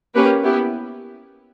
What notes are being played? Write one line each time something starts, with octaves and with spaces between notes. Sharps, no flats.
A#3 C#4 G4 B4
B3 E4 G4